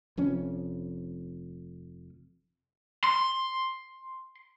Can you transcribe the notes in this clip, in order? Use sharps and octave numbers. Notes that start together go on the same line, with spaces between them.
F1 F2 C#4
C6